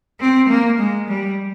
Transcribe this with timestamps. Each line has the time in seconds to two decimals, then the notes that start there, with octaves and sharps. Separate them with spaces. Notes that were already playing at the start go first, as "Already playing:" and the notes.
0.20 C4
0.49 A#3
0.79 G#3
1.09 G3